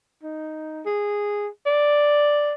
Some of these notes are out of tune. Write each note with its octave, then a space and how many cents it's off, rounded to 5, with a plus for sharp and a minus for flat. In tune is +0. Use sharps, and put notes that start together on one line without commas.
D#4 +0
G#4 -10
D5 +0